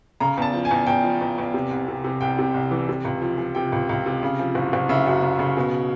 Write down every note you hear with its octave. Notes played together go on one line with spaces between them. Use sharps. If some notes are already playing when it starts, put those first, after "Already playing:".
C#3 A#5
E2 A5
F3
G#5
E2
E2 G5
F3
E2
E2
C3
C2
C3
C3
C2 G5
C3
C2
E3
C3
C#2
F3
F3
C3 G5
C#2
C#2
C3
C#3
F3
F#1
F#1
C#3 E5
F#2
C#3
C#3
B2